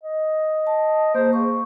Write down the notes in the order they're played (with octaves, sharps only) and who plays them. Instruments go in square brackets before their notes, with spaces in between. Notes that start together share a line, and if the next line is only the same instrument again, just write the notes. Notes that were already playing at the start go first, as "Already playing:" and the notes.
[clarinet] D#5
[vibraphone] A5
[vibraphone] A#3 G#4 [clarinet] C5
[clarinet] A#3 [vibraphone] C#6